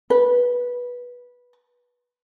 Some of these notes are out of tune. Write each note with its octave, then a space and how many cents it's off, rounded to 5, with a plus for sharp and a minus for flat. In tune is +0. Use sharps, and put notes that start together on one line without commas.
B4 -15